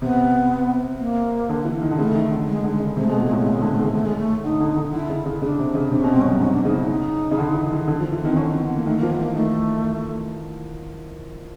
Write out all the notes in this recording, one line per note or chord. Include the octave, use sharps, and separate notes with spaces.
C3 B3
A#3
D3
E3
D#3
D3
C#3 A3
D#3
D3
G#3
D3
G#3
C#3
C3 G#3
A3
B2 G#3
A3
A#2 G#3
A2 A3
G#3
C#3 A3
G#3
D3 A3
G#3
A3
D#3 G#3
A3
G#3
A3
D3 D#4
D3
D3
D3 E4
C#3
C#3
C#3 D4
C3
C#3
C3 D4
B2 C#4
G2 C4
C#4
F#2
G#2 C#4
D4
C#3 D#4
E4
D#4
C#3
D3
E3
D#3
D3
F3
E3
B3
D#3
C4
D3 C#4
C4
B3
A#3
D#3 A3
A#3
F3
B3
E3 A3 A#3
D#3 A3